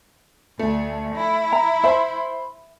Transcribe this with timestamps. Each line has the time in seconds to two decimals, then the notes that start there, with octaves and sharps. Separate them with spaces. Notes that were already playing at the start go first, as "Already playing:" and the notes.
0.59 D2 A3
1.15 E4
1.53 A#5
1.84 C5 E5 B5